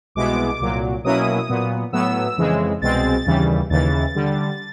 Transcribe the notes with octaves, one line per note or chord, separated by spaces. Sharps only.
C2 B2 G#3 B3 E4 D6
C2 A#2 F#3
B2 F#3 A#3 C#4 E4 D#6
A#2 F#3 B3
A2 F#3 B3 E6
F2 C#3 E3 G#3
C2 B2 G#3 C4 A6
D#2 C#3 E3 G3
D#2 C#3 E3 A6
D3 G3